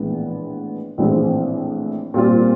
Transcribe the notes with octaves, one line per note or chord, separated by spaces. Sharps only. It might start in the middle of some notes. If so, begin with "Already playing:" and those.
Already playing: A#1 A2 E3 G#3 B3
A#1 A2 E3 G#3 C4
A#2 G3 C4 F4